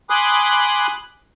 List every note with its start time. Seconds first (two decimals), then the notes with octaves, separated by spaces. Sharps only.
0.10 G#5 B5 C6 D6 D#6 F#6